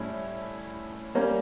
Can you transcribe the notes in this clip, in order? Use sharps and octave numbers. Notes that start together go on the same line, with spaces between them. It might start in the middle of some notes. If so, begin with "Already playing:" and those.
Already playing: A2 G3 C#4 E4
G3 A#3 C#4